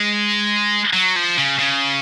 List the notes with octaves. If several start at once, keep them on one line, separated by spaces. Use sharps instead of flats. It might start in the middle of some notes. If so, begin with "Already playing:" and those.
Already playing: G#3
F#3
F3
C#3
C#3